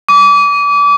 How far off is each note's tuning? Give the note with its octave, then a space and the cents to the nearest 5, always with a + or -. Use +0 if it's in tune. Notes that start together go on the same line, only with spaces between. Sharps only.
D6 -35